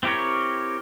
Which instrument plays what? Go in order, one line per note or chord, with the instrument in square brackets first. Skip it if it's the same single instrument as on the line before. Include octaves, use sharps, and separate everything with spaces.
[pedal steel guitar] C4 E4 G4 A#4 C#5